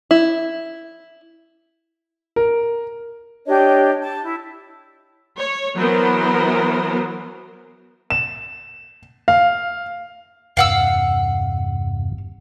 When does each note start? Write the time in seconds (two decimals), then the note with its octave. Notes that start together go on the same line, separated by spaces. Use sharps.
0.11 E4
2.36 A#4
3.46 D4 G4 C#5 D#5
4.01 A5
4.22 E4
5.38 C#5
5.76 E3 F#3 B3 A#4 C5
8.10 E7
9.28 F5
10.57 E2 G2 C3 F5 F#5 E6